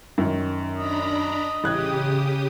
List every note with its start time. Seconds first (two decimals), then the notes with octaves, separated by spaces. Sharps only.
0.18 F#2 D#3
0.77 D4 D#5 A#5 B5
1.64 A1 C#3 G4 D#6 F#6 G#6